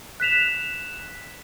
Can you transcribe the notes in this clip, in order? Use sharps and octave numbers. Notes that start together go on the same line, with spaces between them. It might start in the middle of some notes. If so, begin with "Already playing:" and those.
F#6 B6 E7 F7